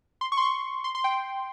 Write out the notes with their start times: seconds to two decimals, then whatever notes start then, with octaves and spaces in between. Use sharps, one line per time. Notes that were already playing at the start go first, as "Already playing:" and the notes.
0.21 C6
0.32 C#6
0.37 C6
0.42 C#6
0.84 C6
0.95 C6
1.04 G5